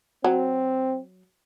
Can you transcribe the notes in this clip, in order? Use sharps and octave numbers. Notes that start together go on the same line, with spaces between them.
F#3 C4